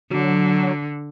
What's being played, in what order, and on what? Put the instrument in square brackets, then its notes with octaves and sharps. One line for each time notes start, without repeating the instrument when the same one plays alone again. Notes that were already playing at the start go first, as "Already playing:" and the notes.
[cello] D3 [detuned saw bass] F#3